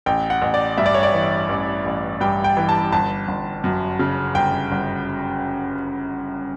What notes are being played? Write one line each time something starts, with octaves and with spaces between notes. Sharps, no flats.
A1 G5
F#5
A1
D5
G2 E5
D5
C#5
D5
E3
A1
A1
G2 G5
G5
E3
A5
G1 A5
G1
F#2
C#3
G1 G5
G1